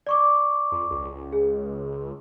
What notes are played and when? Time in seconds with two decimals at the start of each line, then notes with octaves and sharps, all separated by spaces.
0.07 D5 C#6 D6
0.72 F2
0.90 C#2
1.32 G#4